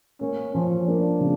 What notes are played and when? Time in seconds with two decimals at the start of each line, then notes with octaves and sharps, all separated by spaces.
0.21 A#3 C#4
0.54 F3 C#4
0.87 A#3 D4
1.20 C#3